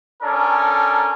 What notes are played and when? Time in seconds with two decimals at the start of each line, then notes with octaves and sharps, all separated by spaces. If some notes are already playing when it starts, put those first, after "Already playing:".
0.22 C#4 D4 A4 A#4